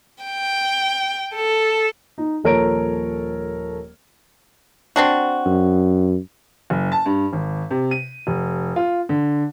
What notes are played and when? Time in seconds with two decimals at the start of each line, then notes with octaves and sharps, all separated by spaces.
0.24 G5
1.33 A4
2.18 D#4
2.44 D#1 F3 A4 A#4 C#5 D7
4.96 C4 D4 F#4
5.46 F#2
6.70 F#1
6.92 A5
7.06 G2
7.33 G#1
7.71 C3
7.91 D#7
8.27 F1
8.76 F4
9.09 D3